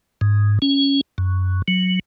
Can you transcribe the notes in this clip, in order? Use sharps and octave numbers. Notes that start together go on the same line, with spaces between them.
G#2
C#4
F#2
F#3